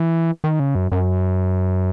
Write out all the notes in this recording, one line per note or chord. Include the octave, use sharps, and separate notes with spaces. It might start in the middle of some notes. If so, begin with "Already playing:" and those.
Already playing: E3
D#3
C#3
F#2
F#2